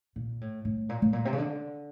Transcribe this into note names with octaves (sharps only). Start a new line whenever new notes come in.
A#2
A2
A2
A#2
A2
A#2
C3
C#3
D3